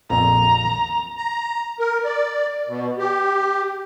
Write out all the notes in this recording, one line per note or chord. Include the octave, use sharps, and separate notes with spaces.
A#1 F2 A#2 A#5
A#5
A#4
D5
B2
G4